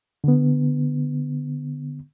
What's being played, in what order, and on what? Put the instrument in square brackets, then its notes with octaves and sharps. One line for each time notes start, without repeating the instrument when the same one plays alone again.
[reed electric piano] D3 B3